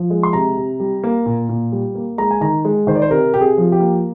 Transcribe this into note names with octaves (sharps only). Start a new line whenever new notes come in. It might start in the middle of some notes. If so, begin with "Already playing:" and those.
Already playing: F3
G#3
C6
C3 A#5
C3
G3
A#3
A#2
A#2
G3
A#3
G#3 A#5
G#5
D#3 A#5
G#3
D#3 C5
D5
C5
C3 A#4
C3 G4
G#4
F3
G4
A#3